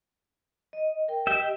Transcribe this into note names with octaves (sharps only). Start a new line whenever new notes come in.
D#5
A#4 G5
G4 D#5 E5 G5